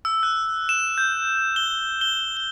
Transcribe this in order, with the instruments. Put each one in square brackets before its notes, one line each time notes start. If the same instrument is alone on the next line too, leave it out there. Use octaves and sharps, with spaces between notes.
[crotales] E6
F#6
E7
G6
G7
G7
G7